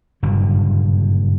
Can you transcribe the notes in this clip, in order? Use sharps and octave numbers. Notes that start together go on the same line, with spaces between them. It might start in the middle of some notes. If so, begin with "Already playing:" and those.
F#1 G2 A#2 D3